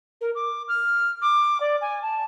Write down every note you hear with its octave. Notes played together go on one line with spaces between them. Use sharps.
A#4
D6
F6
D6
D5
G#5
A5